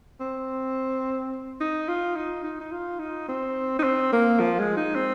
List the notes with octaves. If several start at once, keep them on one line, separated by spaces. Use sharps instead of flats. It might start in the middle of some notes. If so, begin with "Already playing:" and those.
C4
D#4
F4
D#4
D#4
D#4
F4
D#4
C4
D#4
C4
A#3
F3
G#3
D#4
C4